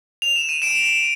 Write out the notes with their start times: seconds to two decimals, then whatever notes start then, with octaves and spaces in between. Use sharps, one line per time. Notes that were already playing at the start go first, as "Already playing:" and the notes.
0.22 F7
0.36 E7
0.49 D#7
0.62 D7 E7